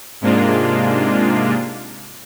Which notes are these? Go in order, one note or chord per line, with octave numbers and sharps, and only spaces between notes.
G#2 C3 G#3 A#3 D4 F4